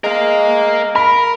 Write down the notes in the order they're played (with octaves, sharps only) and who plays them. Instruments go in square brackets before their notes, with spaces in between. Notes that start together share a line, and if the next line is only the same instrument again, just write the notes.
[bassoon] G#3 [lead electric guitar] A#4 F5
[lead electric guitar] A#4 [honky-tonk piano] B5